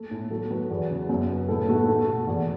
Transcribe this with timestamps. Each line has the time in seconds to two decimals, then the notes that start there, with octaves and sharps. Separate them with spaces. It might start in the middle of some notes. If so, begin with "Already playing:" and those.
Already playing: A3 A4
0.11 A2
0.31 F#3 A4
0.50 F#3 B4
0.70 E2
0.90 C#3
1.09 F#2
1.30 B3
1.49 A2 A4
1.69 A3 F#4
1.88 A3 A4
2.08 B2
2.27 E2